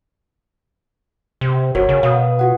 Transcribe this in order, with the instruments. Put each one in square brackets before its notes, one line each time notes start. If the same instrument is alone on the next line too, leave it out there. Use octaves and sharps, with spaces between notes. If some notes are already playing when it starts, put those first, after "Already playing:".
[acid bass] C3
[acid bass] G1 [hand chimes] F#4 A#4 C#5
[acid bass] C#3
[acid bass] B2 [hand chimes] F5 D#6
[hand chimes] F4 F#4 F#5